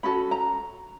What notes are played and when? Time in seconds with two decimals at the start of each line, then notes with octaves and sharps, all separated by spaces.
0.03 C#4 F#4 A4 B5
0.31 A#5